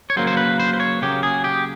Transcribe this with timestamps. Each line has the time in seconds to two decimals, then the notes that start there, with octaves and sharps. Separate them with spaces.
0.10 C#5
0.16 C#3 F#3 A#3 C5
0.27 C5
0.37 B4
0.60 C5
0.73 C5
0.80 C#5
1.02 C#3 F#3 A#3 G4
1.23 G#4
1.44 G4